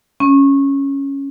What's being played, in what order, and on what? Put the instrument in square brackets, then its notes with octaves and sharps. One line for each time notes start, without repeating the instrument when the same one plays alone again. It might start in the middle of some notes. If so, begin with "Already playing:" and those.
[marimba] C#4